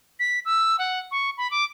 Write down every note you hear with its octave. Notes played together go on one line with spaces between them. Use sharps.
B6
E6
F#5
C#6
B5
D6